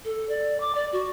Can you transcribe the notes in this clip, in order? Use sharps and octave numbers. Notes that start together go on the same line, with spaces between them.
A4
D5
D6
D5
F#4